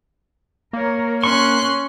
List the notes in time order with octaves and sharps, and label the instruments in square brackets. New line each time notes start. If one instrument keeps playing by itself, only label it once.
[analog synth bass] A#3 [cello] A#4 C#5
[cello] C#4 [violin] C6 F#6 [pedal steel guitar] C#6